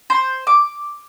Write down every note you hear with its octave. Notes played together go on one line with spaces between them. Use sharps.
C5
D6